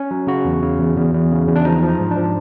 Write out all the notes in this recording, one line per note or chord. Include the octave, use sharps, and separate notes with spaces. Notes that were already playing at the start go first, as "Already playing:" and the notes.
Already playing: C#4
F#3
C#3 F#4
E2
C#3
E2
E2
E2
C#3
E2
D4
F3 D#4
F3
D#4
G#2
D4
F3